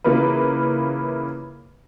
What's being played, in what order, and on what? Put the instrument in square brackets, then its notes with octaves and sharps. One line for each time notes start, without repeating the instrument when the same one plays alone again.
[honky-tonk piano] C#3 E3 A#3 F4 B4